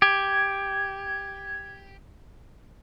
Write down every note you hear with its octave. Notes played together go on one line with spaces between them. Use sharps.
G4 G#6